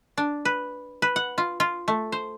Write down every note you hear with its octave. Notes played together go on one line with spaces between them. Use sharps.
D4
B4
B4
F#5
F4
F4
A3
C5